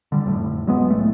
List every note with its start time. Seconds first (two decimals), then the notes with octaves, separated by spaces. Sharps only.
0.12 D3 G3
0.25 F1 A2
0.67 F#3 G#3 B3
0.90 C2 A2 A3